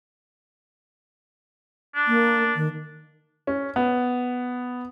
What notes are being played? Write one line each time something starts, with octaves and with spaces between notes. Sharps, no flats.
D4
A#3
D#3
C#4
B3